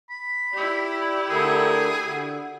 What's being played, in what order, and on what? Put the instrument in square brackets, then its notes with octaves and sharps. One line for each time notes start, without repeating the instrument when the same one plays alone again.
[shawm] B5
[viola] E4 G4 [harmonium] D5
[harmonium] D3 A3 A#4 [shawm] G#4
[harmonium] D3 F#4